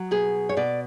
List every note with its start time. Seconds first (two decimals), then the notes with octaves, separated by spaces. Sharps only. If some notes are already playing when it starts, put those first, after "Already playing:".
Already playing: F#3
0.11 B2 G#4
0.49 C#5
0.57 B2 D5